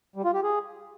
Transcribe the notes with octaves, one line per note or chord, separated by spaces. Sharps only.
G3
F4
G4
G#4